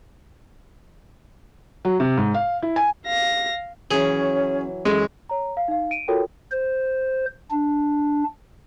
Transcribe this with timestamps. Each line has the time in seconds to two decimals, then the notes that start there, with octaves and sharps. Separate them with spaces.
1.85 F#3
2.00 C3
2.17 G#2
2.34 F5
2.62 E4
2.76 G#5
3.06 F5 A#6
3.91 E3 F#3 C#4 G#4
4.85 F#2 E3 F#3 G#3 A4
5.29 C#5 A#5
5.57 F5
5.68 D#4 F5
5.91 D7 D#7
6.08 F4 F#4 A4 A#4 C#5 G5
6.52 C5
7.51 D4